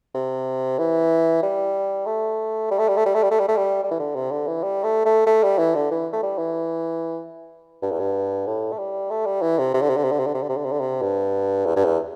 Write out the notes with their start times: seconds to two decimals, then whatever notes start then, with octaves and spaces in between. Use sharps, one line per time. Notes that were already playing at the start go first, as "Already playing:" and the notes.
0.15 C3
0.79 E3
1.43 G3
2.07 A3
2.71 G3
2.79 A3
2.89 G3
2.97 A3
3.06 G3
3.15 A3
3.23 G3
3.31 A3
3.40 G3
3.48 A3
3.57 G3
3.84 G3
3.91 E3
4.00 D3
4.15 C3
4.31 D3
4.47 E3
4.63 G3
4.84 A3
5.06 A3
5.26 A3
5.43 G3
5.58 E3
5.75 D3
5.91 E3
6.13 A3
6.23 G3
6.38 E3
7.82 G2
7.91 E2
8.00 G2
8.47 A2
8.72 A3
8.78 G3
9.11 A3
9.26 G3
9.42 E3
9.59 C3
9.74 C3
9.82 D3
9.90 C3
9.97 D3
10.04 C3
10.12 D3
10.19 C3
10.27 D3
10.34 C3
10.43 D3
10.49 C3
10.57 D3
10.66 C3
10.73 D3
10.81 C3
11.02 G2
11.66 E2
11.76 G2
11.85 E2